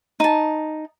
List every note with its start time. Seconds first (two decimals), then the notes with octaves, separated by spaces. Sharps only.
0.20 D#4 A5